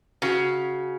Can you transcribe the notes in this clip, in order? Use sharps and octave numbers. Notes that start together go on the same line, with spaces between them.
C#3 F#4